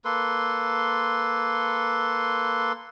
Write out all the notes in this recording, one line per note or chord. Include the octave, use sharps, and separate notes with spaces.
A#3 A4 B4 C6